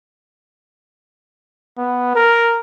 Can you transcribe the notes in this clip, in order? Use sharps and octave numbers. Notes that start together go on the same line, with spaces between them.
B3
A#4